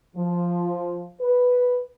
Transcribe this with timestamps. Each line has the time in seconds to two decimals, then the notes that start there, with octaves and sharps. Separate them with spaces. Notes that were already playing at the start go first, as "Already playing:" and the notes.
0.16 F3
1.21 B4